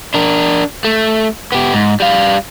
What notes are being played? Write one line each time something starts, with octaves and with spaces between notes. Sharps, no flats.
D4 A#4
A3
B3 G4
G#2
G3 F5